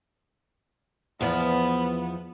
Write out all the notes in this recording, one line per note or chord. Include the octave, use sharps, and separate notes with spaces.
E2 F3 B3